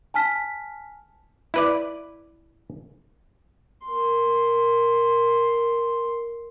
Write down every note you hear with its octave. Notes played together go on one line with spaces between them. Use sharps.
G#5 A5 F6 B6
E4 B4 D5
A#4 C6